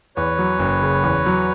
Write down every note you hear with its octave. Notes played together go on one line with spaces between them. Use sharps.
E2 B4 C#5
F#3
F#1
C#3
E2
F#3